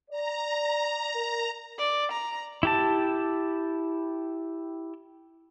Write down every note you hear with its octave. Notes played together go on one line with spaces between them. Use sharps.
D5 A#5
A#4
D5
A#5
E4 G4 A5